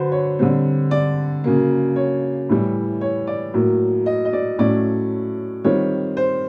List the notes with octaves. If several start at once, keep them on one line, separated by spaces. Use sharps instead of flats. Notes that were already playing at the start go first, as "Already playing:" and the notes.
Already playing: D3 F#3 B4 C5
C#5
D3 G3 C4
D5
C#3 F#3 A#3
C#5
A2 E3 G3
C#5
D5
A2 F#3 A#3
D#5
D#5
D5
A2 F#3 A3 C#4 D5
D#3 G3 C4 F4 C#5
C5